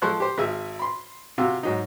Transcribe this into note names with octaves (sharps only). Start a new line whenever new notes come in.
F3 G#3 A4 C5 C#6 F#6
G4 C5
G#1 G#4 E5
B5 C6
C3 F4 F#4 E6
G#2 F#3 D#4